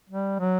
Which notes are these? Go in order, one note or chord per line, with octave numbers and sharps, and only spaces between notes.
G3
F#3